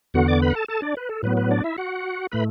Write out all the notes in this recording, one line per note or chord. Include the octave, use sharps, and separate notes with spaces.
E2 D3 B3 F#4 F#5
D5 D6
B4 B5
F#5
A4 A5
A4 A5
D4 D5
B4
A4
A2 F#3 B3 B4
B4
D4 D5
E4 E5
F#4 F#5
A2 A3 B4 B5